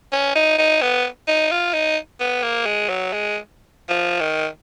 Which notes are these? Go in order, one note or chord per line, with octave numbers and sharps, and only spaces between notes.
C#4
D#4
D#4
B3
D#4
F4
D#4
B3
A#3
G#3
F#3
G#3
F3
D#3